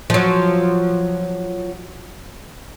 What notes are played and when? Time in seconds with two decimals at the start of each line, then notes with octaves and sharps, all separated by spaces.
0.10 F3 F#3